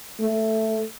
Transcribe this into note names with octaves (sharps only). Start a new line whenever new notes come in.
A3